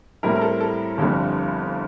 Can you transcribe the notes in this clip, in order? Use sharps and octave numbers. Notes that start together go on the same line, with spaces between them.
A2 G3 C4 E4 A#4
A#4
A4
A4
G1 F2 D3 G3